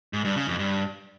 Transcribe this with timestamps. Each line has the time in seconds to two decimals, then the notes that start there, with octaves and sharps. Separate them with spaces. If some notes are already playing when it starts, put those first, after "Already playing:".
0.13 G#2
0.25 G2
0.36 C#3
0.47 F2
0.59 G2